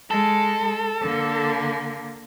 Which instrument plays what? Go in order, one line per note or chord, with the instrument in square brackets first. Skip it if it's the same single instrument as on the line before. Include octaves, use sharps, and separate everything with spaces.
[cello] G#3 [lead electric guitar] A4
[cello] D3 A#3